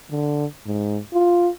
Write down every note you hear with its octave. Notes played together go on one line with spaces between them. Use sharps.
D3
G#2
F4